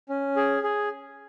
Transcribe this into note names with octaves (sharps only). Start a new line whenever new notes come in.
C#4
G#4
G#4